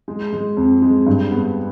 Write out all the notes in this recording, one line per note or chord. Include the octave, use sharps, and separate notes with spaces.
G#3
G#3
F2
G#3
G2
B3